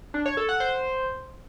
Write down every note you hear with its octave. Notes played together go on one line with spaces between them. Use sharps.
D4
C#5
A4
F#5
C5